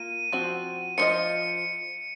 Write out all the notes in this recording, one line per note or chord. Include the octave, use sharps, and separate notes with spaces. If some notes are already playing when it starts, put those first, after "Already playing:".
Already playing: A#3 F4 D#7
F3 C4 F#4
F3 C4 F4 C5 D#5 C#7